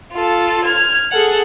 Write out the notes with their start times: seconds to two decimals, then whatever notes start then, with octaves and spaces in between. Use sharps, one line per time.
0.12 F4 A4
0.63 F6 G#6
1.11 G#4 A4 F#5